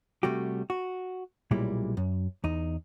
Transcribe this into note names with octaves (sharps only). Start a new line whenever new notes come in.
C3 G3 A3 F#4 G4
F#4
B1 A#2 G3 G#3 E4
F#2
E2 D#4